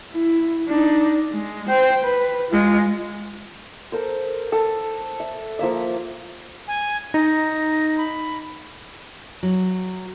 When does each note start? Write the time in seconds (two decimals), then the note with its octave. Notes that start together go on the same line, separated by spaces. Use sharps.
0.11 E4
0.69 D4 D#4
1.32 G#3
1.69 C5 G5
2.04 B4
2.50 G#3 F4
3.92 A4 A#4 C5
4.52 A4
5.20 E5
5.59 F3 A#3 E5
6.68 G#5
7.14 D#4 A#6
7.98 B5
9.43 F#3